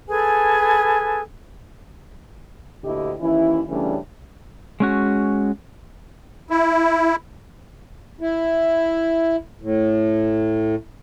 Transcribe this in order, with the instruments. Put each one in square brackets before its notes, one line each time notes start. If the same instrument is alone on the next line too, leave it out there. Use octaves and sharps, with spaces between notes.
[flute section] G#4 A4 B4 G#5
[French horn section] D2 A#2 D3 E4 G4 D#5
D#2 E3 C#4 E4
C#3 E3 G3 A3 C#4 D4
[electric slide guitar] G#3 C#4 F#4
[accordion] E4
[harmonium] E4
A2